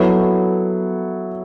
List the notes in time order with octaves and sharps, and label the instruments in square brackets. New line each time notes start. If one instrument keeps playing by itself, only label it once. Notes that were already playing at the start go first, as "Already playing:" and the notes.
Already playing: [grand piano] F#3 B3 E4 A4